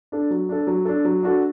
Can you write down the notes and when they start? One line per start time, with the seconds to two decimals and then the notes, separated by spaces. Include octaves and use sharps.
0.12 D4 A4
0.30 F#3
0.49 D4 A4
0.67 F#3
0.85 D4 A4
1.05 F#3
1.23 D4 F#4 A4